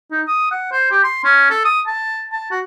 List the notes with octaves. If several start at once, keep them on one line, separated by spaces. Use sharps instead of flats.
D#4
D#6
F#5
C5
G4
C6
C#4
A4
D#6
A5
A5
F#4